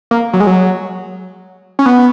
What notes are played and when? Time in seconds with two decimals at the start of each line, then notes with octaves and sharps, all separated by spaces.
0.11 A#3
0.33 F#3
0.40 G#3
0.47 F#3
1.79 C#4
1.86 B3